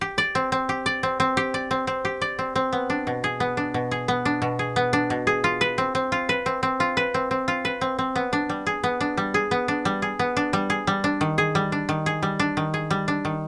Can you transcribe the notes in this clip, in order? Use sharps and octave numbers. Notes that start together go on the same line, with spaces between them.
G4
D5
C4
C4
G4
D5
C4
C4
G4
D5
C4
C4
G4
D5
C4
C4
B3
D4
B2
G#4
B3
D4
B2
G#4
B3
D4
B2
G#4
B3
D4
B2
G#4
F4
B4
C4
C4
F4
B4
C4
C4
F4
B4
C4
C4
F4
B4
C4
C4
B3
D4
G3
G#4
B3
D4
G3
G#4
B3
D4
G3
G#4
B3
D4
G3
G#4
G3
D4
D#3
G#4
G3
D4
D#3
G#4
G3
D4
D#3
G#4
G3
D4
D#3